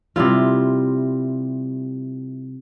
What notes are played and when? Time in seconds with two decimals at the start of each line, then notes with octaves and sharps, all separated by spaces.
0.16 C3 G3 E4 F4